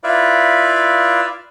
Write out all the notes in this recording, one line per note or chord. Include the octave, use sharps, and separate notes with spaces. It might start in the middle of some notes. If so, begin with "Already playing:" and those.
E4 F4 B4 D5 E5 F5